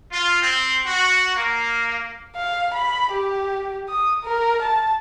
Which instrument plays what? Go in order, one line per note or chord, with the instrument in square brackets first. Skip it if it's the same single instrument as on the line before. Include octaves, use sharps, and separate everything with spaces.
[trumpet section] F4
C4
F#4
A#3
[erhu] F5
B5
G4
D#6
A#4
A5